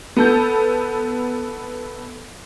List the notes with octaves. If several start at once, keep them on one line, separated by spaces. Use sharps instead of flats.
B3 A4 G6